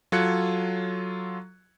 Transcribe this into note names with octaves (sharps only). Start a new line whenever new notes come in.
F#3 F4 A4 F#6 G#6 C#7